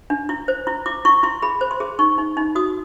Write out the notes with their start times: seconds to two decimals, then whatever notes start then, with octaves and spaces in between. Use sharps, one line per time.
0.10 D4
0.29 E4
0.48 C5
0.67 E4
0.86 E4 D6
1.05 E4 C#6
1.23 E4 C6
1.42 G#4 B5
1.61 C5
1.71 C6
1.80 G#4
1.99 D#4 C#6
2.18 D#4
2.37 D#4
2.55 F#4 D#6